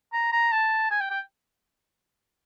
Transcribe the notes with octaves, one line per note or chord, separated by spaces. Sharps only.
A#5
A#5
A5
G#5
G5
G5